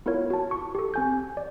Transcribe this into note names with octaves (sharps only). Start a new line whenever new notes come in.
B3 E4 F4 A#4 C#5
F#4 A5
C#6
G4 A4
C4 G#5 G6
D5